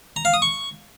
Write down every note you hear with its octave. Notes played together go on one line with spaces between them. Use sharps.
A#5
F5
D#6
C#6